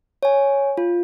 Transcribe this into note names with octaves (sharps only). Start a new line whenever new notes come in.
C#5 G#5
F4